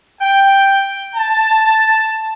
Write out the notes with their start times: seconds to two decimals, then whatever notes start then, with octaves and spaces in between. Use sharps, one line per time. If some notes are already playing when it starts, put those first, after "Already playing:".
0.22 G5
1.15 A5